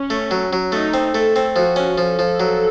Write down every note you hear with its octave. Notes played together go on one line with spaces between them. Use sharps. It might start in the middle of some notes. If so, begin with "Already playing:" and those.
Already playing: C#4
A3
F#3
F#3
A3 D#4
C4
A3 A4
C4
F3 F#4
C#4
F3 A4
F3
F#3